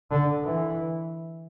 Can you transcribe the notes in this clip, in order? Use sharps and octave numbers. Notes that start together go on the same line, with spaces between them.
D3
E3